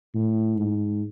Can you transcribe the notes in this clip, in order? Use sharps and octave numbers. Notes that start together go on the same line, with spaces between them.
A2
G#2